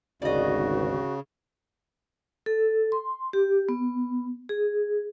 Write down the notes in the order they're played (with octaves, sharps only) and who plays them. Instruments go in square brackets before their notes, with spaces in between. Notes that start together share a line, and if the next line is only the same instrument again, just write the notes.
[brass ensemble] G#1 D2 [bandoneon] C#3 [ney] F#4 [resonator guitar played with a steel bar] D5 D#5
[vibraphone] A4
C6
G4
B3
G#4